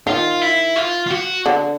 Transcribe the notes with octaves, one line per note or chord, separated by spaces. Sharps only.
D#3 F4
E4
F4
F4
F#4
D3